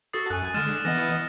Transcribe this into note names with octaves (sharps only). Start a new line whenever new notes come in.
F#4 A4 D#6 A6 C7
F#2 G#5 F#6 D#7
D3 G#3 F6 A6 E7
E3 B3 D#5 A#6